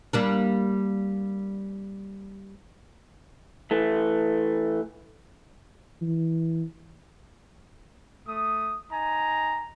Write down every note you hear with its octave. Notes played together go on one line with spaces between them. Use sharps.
G3 A#3 D4
E3 A3
E3
A3 D#6
D#4 G#5 A#5